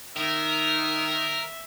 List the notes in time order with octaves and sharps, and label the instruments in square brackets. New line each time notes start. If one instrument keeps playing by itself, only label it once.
[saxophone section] D#3 [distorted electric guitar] A#4 [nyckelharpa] E5